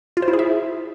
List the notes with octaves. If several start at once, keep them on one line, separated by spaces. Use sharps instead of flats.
F4
C5
E4
G#4
E5